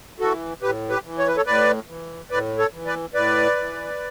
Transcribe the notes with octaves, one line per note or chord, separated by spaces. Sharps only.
E3 F#4 A4
A2 G4 B4
G4 B4
E3
C#5
B4
A4 C#5
A2 B4 D5
E3
A2 B4 D5
A4 C#5
E3
B4 D5
A2 B4 D5
E3